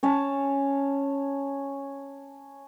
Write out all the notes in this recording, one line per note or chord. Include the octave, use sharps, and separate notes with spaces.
C#4 C#5 A5